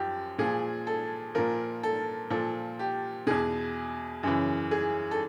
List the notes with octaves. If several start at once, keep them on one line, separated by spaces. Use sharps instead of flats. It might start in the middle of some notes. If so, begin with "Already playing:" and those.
Already playing: F#2 F3 G4
A#2 F3 G#4
A4
A#2 F3 A#4
A4
A#2 F3 A4
G4
E2 B2 G#4
F#2 C#3 E3
G#4
A4